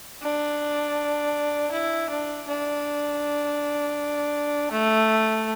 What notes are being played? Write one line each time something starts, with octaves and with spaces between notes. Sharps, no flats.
D4
E4
D4
D4
A3